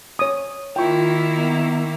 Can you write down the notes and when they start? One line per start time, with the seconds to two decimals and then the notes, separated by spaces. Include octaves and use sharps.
0.19 C#5 D#6
0.76 D#3 A#3 E4 F4 G5 C#6
1.36 B3